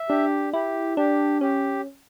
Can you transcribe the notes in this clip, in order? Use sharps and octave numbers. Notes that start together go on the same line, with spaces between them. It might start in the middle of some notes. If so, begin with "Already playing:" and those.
Already playing: E5
D4 G4
E4 G4
D4 G4
C#4 G4